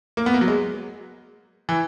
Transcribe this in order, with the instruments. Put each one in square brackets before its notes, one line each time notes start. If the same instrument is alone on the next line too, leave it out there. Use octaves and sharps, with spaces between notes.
[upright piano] A#3
B3
A#3
F#3
G#3
E3